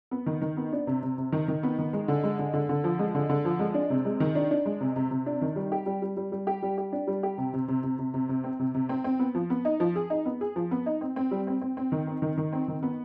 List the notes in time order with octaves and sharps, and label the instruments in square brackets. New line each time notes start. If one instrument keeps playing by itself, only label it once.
[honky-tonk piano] B3
D#3
D#3
B3
D4
C3
C3
C3
D#3
D#3
B3
D#3
G#3
D3
G#3
D3
D3
D3
F3
G#3
D3
D3
F3
G#3
D4
C3
G#3
D#3
D4
D4
G#3
C3
C3
C3
D4
D#3
G3
G4
G3
G3
G3
G3
G4
G3
G4
D4
G3
G4
C3
C3
C3
C3
C3
C3
C3
C4
C3
C3
C4
C4
B3
F3
B3
D#4
F3
G#4
D#4
B3
G#4
F3
B3
D#4
C4
C4
G3
C4
C4
C4
D#3
C4
D#3
D#3
C4
D#3
B3